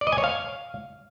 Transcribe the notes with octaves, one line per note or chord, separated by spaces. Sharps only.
D5
D#5
G#5
C#5
F5